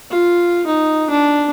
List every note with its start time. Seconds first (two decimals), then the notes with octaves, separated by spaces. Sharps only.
0.10 F4
0.66 D#4
1.10 D4